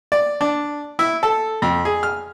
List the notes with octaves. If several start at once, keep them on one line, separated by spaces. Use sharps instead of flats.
D5
D4
E4
A4
F2
G#4
F6